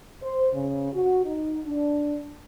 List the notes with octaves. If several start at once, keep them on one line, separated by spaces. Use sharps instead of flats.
C5
C#3
F#4
D#4
D4